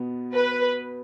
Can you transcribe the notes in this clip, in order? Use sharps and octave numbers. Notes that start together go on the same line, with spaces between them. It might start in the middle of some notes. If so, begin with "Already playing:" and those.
Already playing: B2 B3
B4